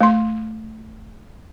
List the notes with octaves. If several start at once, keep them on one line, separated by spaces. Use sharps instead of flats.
A3 C6